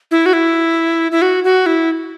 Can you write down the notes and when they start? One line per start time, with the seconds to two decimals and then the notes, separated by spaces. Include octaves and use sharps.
0.11 E4
0.26 F#4
0.33 E4
1.12 E4
1.22 F#4
1.44 F#4
1.66 E4